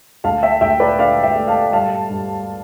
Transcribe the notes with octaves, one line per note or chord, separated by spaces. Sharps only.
D2 F5 A5
E5 G5
D2 E5 G5
B4 D5
D3 D5 F5
E5 G5
A3
F5 A5
G2 F5 A5
G2